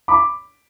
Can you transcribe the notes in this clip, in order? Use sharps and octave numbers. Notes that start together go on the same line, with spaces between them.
B5 D6